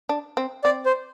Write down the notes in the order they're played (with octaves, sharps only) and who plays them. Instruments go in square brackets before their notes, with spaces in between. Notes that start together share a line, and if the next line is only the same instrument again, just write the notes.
[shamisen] D4
C4
[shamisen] C4 [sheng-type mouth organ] D5
[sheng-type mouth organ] C5